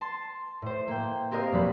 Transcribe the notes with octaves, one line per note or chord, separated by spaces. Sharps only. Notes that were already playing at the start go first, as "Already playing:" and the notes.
A5 C6
A2 C5
A#3 G5
C4 G4 A#4 D#5 F5
E1 F#3 G3 A#3 B5